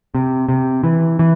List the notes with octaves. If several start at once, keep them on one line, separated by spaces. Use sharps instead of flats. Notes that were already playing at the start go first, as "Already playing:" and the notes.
C3
C3
E3
E3